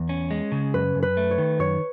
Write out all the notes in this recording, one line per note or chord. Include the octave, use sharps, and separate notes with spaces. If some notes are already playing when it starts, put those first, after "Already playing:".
Already playing: E2
C#4
G#3
C#3
F#2 B4
F#2
B4
A3
C#5
D#3
F#2 C#5